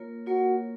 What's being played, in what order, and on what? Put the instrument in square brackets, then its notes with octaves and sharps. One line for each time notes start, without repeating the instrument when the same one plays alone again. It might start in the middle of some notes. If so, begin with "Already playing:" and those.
Already playing: [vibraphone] A#3 F4 A#4 C#5
[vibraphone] A#3 F4 A#4 C#5 [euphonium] F#4